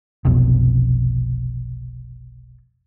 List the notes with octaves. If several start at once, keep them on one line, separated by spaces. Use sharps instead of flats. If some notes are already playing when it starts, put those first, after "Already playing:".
F1 B1 F2 B2